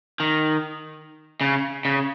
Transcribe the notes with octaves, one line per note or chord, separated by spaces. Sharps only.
D#3
C#3
C#3